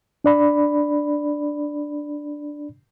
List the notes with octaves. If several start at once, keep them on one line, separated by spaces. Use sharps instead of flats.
D4 D5 B5